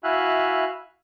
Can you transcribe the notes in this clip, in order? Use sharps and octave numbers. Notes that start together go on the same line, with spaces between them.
E4 F#4 E5 F5 G#5 F#6